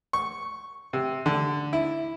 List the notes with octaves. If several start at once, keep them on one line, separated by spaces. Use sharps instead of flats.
C#6
C3
D3
E4